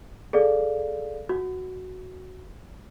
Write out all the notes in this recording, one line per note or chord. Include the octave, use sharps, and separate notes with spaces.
G#4 A4 D5 F5
F#4